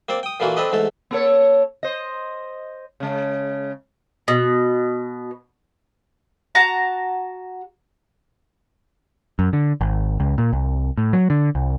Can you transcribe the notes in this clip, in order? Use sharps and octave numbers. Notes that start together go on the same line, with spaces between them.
A#3 C4 C5 D5
G5 D#6
A#2 D3 E3 A#3 F4 F#4
C4 D4 A4 B4 D#5
E2 G#2 A3 A4
A#3 A4 C#5
C5 D#5
C#3 G#3
B2
F#4 A5 A#5
F#2
D3
G#1
C#2
A#2
C2
A2
F#3
D3
C2